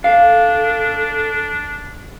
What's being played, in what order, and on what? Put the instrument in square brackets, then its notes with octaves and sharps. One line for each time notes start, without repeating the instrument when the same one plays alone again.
[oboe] D4 [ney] A4 [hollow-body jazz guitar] F5